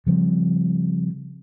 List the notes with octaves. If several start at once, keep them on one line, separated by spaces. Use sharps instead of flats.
C#3 F3 G3 C4